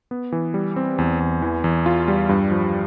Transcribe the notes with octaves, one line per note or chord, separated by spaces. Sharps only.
B3
E3
G3
C4
E2
E2
E3
E2
F4
G3
G2
F3